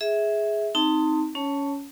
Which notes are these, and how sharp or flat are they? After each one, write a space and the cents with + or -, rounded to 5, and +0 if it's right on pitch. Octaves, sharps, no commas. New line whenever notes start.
G#4 +5 E5 -15
C4 +0 D#4 +10 A5 +30
C#4 +20 C#5 +0 A5 +0